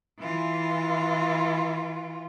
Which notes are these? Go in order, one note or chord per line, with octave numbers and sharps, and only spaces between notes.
E3 F4